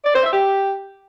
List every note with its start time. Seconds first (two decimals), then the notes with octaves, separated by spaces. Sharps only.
0.05 D5
0.14 C5
0.24 E5
0.33 G4